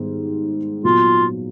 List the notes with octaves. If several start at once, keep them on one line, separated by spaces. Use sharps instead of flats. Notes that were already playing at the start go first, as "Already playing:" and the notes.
Already playing: G#2 D#3 G3 B3
A#2 F#3 B3 F4